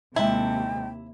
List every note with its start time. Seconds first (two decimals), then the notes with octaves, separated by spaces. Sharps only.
0.16 D#2 C3 G#3 E4 G5 A5